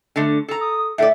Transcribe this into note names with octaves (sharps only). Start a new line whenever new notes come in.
D3 A3
A4 A#5
D#6
A2 A4 D5 E5